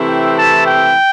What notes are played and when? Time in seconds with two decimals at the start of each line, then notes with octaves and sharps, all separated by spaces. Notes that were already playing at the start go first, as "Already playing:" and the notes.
Already playing: C3 E3 A3 C4 E4
0.08 G5
0.38 A5
0.67 G5